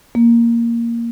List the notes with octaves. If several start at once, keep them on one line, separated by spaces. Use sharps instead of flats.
A#3